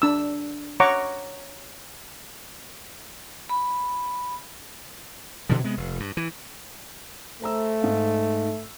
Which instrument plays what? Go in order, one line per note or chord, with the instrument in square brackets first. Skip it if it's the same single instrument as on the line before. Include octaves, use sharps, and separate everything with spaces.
[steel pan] D4 E6
C#5 F#5 A#5 C#6 D6
[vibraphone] B5
[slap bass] B2 D3 E3 F3
C3 G#3 B3
F1
G2
E3
[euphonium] A3 [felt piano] C5 A#5 E6
[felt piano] G#2 F5